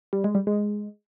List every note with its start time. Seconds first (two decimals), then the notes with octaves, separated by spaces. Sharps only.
0.13 G3
0.24 G#3
0.35 G3
0.47 G#3